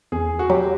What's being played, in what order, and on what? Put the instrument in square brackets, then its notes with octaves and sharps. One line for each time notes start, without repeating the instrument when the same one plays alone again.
[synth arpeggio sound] E2 [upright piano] G#4
[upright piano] F#4
[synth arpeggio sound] F#3 [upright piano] G4